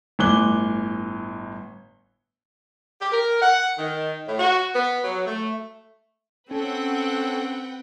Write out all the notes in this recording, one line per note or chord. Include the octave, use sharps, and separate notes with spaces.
G1 A2 G#5 D6 F#6 G7
G4
A#4
F#5
D#3
A2
F#4
B3
F#3
A3
C4 C#4 A4 B4 F#5 G5